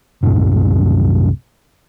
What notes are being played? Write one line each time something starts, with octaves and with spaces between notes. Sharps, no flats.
C2 F#2 A2 C3